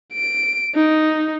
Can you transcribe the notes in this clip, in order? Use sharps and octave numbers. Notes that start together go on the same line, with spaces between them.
D7
D#4